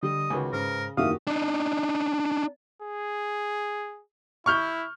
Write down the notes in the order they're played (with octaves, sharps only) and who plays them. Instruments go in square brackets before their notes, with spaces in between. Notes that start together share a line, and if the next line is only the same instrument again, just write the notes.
[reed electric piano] D3 [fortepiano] G3 [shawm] D#5
[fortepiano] C#2 D#3 F#4 [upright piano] B4 G#5
[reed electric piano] G#2 C5 [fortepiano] C#3 [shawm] A#4
[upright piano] F#1 E2 D#3 [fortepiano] F#4 G4 [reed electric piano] E5 F5 [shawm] D#6
[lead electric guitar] D4 D#4
[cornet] G#4
[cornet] E4 [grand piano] C#6 F6 G6